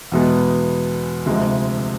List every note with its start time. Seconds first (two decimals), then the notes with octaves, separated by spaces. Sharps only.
0.12 E2 B2 G#3 B3
1.26 D2 C3 F3 G#3